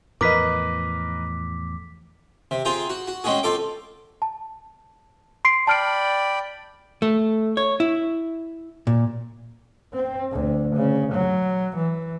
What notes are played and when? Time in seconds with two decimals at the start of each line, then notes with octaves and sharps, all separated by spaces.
0.21 E2 A2 F3 A#4 B4 D#5 D6 B6
2.51 C3
2.65 C4 F4 G#4 G5 A#5
2.90 F#4
3.08 F#4
3.24 G#3 C4 C#4 F#4 G#4
3.43 C4 F4 A4 D6
4.22 A5
5.45 C6 C7 D7
5.67 D5 G5 A5 B5 F6 D7
7.02 A3
7.57 C#5
7.80 E4
8.87 A#2
9.93 C4
10.32 D2
10.76 C#3
11.12 F#3
11.76 E3